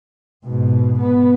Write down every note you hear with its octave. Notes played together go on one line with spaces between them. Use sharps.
G#2 B2
B3